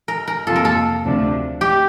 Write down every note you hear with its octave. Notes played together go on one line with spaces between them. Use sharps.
A#4
A#4
F2 C3 F3 A#3 F4 A4
A#4
A4
D2 C3 F3 A3 D4
G4